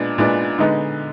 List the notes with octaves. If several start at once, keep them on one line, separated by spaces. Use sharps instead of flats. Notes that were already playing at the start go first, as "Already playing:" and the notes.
Already playing: A#2 G#3 B3 D4
A#2 G#3 B3 D4
D3 G#3 B3 D#4